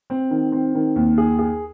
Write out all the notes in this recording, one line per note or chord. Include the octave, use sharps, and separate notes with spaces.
C4
D#3
C4
D#3
D#2
G#4
G#4